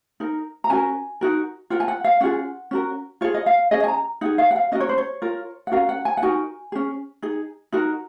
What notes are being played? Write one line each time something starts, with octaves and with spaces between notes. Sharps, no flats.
D#4 A#4
A#5
C#4 F#4 A#4 G#5
D#4 F#4 A#4
F4 A#4 F#5
G#5
F#5
F5
C#4 F4 G#4 F#5
C#4 F#4 A#4
F4 G#4 C#5
D#5
F5
C#4 G#4 D#5
G#5
A#5
D#4 G#4 F#5
F5
F#5
F5
C#4 F#4 A#4 D#5
C#5
C5
C#5
F4 A#4
F#5
C#4 F#4 A#4 F5
F#5
G#5
F#5
D#4 F#4 A#4 G#5
C#4 G#4
D#4 G#4
D#4 F#4 A#4